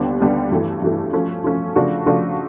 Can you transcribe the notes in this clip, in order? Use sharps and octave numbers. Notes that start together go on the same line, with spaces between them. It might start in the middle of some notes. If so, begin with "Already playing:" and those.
Already playing: D#2 D3 G3 B3 D4
D#2 D3 G3 B3 D4
G2 E3 A3
G2 E3 A3
F3 A3 C#4
F3 A3 C#4
C#3 F3 A3 D4 F#4
C#3 F3 A3 D4 F#4